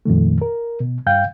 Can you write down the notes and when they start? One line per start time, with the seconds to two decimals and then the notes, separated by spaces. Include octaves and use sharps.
0.05 F2 A#2 D#3 A3
0.42 A#4
0.80 B2
1.06 G2 F5 G5 G6